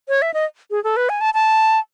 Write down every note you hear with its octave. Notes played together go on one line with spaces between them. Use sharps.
C#5
E5
D#5
G#4
A4
B4
G#5
A5
A5